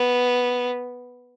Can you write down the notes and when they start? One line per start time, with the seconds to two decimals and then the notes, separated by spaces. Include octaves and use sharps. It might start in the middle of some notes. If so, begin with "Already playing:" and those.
Already playing: B3